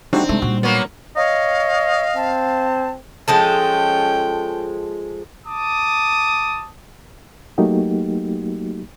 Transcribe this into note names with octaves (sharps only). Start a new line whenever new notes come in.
G3 A3 C4 D4 D#4 F#4
C2 G#3 A3
A#2 G3 F#4
F#3 A#3 B3 C#5
C#5 D#5 F5
C4 A5
F3 G#3 C#4 A4 G5
A5 D6 D#6
F#3 A3 A#3 D#4 F#4 G4